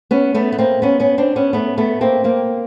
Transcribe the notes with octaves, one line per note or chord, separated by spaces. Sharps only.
B3 C#4
A3 B3
B3
A#3 C4
B3 C#4
B3 C#4
C4 D4
B3 C#4
A3 B3
A3 B3
A#3 C4
A#3 C4